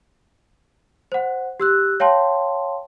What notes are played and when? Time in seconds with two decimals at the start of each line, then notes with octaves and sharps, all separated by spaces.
1.12 C5 F#5
1.60 G4 E6 F#6
2.00 C#5 F5 G5 A5 C6